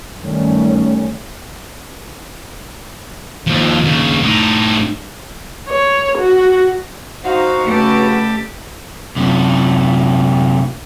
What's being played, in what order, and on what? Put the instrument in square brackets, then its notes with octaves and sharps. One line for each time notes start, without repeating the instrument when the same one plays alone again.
[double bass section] G2 D#3 G3 A3 C#4
[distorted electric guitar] D#2 F3
D#2 C#3
A2 D#4
[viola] C#5
F#4
[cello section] D#4 [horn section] F#4 [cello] C5 F5
[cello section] C#3 B4 [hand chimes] A3 [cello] G4 A4
[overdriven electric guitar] F#2 C3